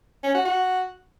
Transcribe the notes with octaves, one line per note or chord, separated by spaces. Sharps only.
C#4
F#4
F#4